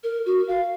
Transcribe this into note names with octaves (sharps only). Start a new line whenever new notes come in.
A#4
F#4
F5